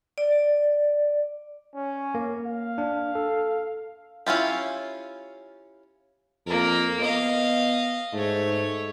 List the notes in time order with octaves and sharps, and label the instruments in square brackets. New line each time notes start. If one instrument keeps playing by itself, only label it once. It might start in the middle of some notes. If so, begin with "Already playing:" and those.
[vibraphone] D5
[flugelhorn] C#4
[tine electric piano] A#3
[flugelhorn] F5
[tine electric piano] D4
A4
[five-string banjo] C#4 E4 F4 G4
[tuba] F2 [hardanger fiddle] A#3 A#4
[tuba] B3 [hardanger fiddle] D#5 F5
[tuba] G#2 [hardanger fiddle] A3 C#5